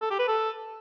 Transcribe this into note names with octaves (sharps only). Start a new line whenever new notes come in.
A4
G4
B4
A4